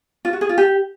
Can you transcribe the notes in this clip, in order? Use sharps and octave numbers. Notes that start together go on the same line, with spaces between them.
F4
F#4
G#4
F4
G4